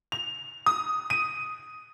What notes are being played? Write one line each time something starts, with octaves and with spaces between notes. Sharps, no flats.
F7
D#6
D#7